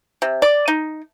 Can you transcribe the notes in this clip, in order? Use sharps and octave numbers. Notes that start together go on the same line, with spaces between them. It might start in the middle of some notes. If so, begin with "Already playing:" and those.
C3
D5
D#4